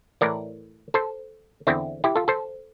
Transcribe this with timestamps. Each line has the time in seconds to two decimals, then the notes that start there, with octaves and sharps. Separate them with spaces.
0.21 A2 E3 A#4 D5
0.94 A4 C5
1.67 E2 D3 C4 E4
2.04 E4 G4
2.16 F4 A4
2.28 A4 C5